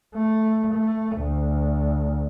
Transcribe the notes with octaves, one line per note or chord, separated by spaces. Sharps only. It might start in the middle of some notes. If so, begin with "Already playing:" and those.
A3
A3
D2